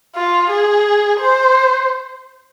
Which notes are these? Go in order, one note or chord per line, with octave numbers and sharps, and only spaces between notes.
F4
G#4
C5